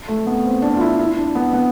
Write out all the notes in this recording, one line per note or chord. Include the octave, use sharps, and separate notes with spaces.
A3
B3
C4
D4
F4
E4
E4
D4
B3
B3